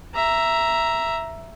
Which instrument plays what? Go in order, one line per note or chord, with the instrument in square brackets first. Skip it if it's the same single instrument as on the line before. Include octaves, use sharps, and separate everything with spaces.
[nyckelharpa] E5 A#5